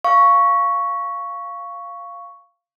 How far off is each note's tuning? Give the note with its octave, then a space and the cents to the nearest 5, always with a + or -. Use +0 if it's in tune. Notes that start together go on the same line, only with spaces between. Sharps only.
F5 -5 C#6 +5